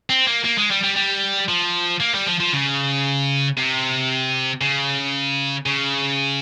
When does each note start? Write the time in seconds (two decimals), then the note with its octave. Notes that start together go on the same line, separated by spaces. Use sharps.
0.10 C4
0.27 A#3
0.44 A#3
0.58 G#3
0.70 G3
0.83 G3
0.96 G3
1.48 F3
2.00 A#3
2.14 G3
2.26 F3
2.40 F3
2.53 C#3
3.57 C3
4.61 C#3
5.66 C#3